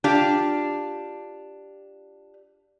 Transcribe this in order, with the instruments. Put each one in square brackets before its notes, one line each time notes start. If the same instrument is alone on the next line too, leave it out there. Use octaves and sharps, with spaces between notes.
[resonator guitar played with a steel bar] D4 F4 G4